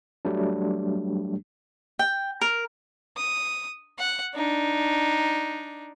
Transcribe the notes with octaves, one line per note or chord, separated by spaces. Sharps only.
F#3 G3 A3 D4
G5
A#4
D#6
F#5
D4 D#4